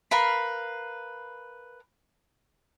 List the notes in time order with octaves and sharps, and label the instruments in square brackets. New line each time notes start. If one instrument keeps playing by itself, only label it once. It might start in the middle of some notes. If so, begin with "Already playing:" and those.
[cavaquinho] A#4 B4 F5 B5